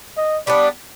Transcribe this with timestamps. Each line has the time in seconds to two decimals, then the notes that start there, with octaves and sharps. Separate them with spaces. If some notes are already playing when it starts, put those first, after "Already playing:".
0.17 D#5
0.47 G3 B3 D4 D5